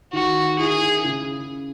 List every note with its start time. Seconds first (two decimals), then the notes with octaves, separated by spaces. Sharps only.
0.13 D#3 F#4
0.58 E4 G#4
1.04 C#3